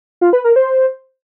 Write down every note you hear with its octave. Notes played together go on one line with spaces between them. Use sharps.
F4
B4
A#4
C5